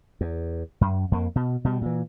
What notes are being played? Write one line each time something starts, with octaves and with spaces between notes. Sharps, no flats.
E2
F#2
F2 A#3
B2
B2 G3
A#2 E3